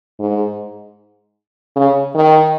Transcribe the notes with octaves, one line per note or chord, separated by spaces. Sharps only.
G#2
C#3
D#3